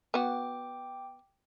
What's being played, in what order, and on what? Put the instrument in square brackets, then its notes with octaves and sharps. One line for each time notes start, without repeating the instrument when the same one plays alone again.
[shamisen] B3 F#4 [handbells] G5 D6